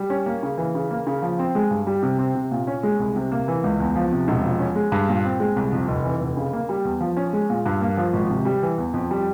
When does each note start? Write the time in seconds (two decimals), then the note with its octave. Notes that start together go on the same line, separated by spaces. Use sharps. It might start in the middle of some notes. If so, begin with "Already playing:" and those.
Already playing: G3
0.10 C#4
0.26 A#3
0.43 C#3
0.58 E3
0.75 C#3
0.91 A#3
1.07 C#3
1.22 F3
1.39 C4
1.55 G#3
1.71 G2
1.87 G3
2.03 C3
2.18 C4
2.35 C3
2.51 A#2
2.67 C#4
2.83 G#3
3.00 C2
3.16 C3
3.32 A#3
3.48 E3
3.64 C#2
3.80 E2
3.96 F3
4.12 C3
4.28 E1
4.44 F3
4.59 C#4
4.75 G#3
4.92 G2
5.09 A#2
5.25 C4
5.40 G#3
5.56 C2
5.73 F2
5.88 F1
6.04 E3
6.21 F1
6.37 C#3
6.53 A#3
6.69 G3
6.85 E2
7.00 F3
7.17 C#4
7.33 G#3
7.50 A#2
7.65 G2
7.81 A#3
7.97 F3
8.13 G#1
8.30 C3
8.45 G3
8.62 E3
8.78 E2
8.93 F2
9.11 G3